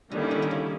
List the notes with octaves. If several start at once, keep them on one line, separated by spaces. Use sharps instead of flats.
D3 D#3 G3 A#3 C#4 E4
D3
D3
C#3